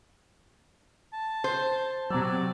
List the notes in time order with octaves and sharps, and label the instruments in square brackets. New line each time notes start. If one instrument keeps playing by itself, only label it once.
[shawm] A5
[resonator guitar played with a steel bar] C5
[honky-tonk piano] C3 E6 [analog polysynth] F#3 [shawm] D5